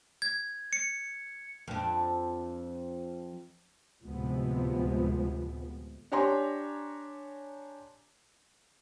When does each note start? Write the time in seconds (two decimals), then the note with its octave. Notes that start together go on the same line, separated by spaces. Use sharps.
0.22 G#6
0.73 C#7
1.68 F2 D4
4.04 D2 A2 C3 F3 G#3 B3
6.12 D4 G4 C#5 G#5 A#5 C6